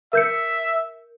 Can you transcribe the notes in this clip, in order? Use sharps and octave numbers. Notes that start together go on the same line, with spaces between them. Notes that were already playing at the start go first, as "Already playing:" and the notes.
A#4 E5 G6 C#7